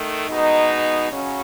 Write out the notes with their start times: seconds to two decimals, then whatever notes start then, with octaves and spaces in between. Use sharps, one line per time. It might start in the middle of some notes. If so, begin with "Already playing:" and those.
Already playing: D#3 A3
0.29 B2 G#3 D#4
1.09 C#3 F#3 C#4